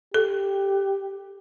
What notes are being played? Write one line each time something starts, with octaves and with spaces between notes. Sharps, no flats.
G4 A4